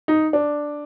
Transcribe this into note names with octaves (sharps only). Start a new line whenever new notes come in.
D#4
D4